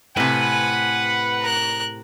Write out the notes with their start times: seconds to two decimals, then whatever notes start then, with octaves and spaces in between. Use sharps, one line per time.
0.17 A2 C3 B4 F#5 G#5
1.42 A#4 F#6